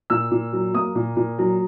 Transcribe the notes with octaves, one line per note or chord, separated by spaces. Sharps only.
A#2 E6
A#2
F#3
A#3 D#6
A#2
A#2
F#3